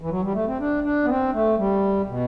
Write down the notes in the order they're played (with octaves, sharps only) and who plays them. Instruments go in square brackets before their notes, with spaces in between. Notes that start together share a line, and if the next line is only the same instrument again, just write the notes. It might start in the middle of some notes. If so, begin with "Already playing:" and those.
[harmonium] E3
F#3
G3
A3
C4
D4
D4
B3
C4
A3
G3
B2